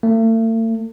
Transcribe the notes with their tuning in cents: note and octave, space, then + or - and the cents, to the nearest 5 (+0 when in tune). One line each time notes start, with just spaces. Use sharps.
A3 +40